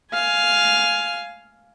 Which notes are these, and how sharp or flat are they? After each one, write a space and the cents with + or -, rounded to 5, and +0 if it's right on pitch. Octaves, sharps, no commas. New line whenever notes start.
F5 +0 G#5 +10